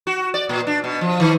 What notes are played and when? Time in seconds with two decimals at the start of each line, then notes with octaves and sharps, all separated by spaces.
0.07 F#4
0.34 D5
0.49 A#2
0.67 D4
0.84 B2
1.01 F3
1.20 D#3